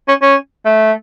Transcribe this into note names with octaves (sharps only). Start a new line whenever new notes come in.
C#4
C#4
A3